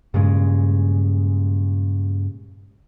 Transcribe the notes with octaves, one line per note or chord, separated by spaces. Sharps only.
G2 A#2 C#3 G#3